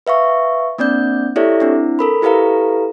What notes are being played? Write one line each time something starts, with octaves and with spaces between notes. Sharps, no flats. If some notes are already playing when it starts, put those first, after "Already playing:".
B4 E5 F5 C#6
A#3 C4 D4 D5 G6
E4 G4 A4 C#5 D5 E5
C4 D4 E4
A4 A#4 B5
E4 G4 A4 B4 F5 A#5